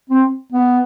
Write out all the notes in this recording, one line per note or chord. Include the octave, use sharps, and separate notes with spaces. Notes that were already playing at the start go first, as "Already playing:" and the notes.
C4
B3